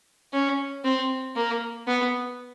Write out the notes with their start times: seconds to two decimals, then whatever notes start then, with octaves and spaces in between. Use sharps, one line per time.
0.33 C#4
0.85 C4
1.36 A#3
1.87 B3